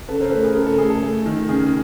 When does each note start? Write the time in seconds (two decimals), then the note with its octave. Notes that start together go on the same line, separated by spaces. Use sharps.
0.09 C#3 A4 B4
0.20 A#4 C5
0.32 A3 A4 B4
0.43 G#4 A#4
0.55 C#3 A#4
0.67 A4
0.78 A3 G#4
0.90 A4
1.03 A3
1.26 D#3
1.49 C#3 G#4